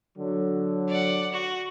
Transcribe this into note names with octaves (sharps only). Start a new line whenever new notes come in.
D3 F#3
D5 F#5
F#4